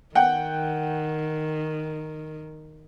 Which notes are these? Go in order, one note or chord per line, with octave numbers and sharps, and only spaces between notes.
D#3 F#5 G5